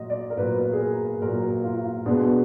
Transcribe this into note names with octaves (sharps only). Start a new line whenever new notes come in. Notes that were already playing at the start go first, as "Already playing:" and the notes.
Already playing: A#2 F#3 D#5
D5
A#4
A#2 F#3 A#3 B4
G#4
A#4
A#2 F#3 A#3 A#4
F4
B2 G#3 B3 D4